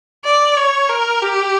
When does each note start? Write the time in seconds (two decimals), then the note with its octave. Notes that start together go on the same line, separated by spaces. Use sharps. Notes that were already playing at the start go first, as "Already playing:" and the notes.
0.25 D5
0.57 C#5
0.89 A#4
1.22 G4